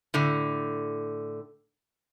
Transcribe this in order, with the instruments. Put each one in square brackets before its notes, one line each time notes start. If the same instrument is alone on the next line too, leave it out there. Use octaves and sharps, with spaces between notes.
[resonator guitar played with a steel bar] A2 D3